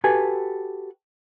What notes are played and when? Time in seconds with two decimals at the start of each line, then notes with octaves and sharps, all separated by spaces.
0.04 F#4 G4 A4 B4 G#5